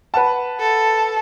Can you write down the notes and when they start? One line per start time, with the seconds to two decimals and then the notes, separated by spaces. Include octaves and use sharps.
0.14 B4 F#5 A5
0.60 A4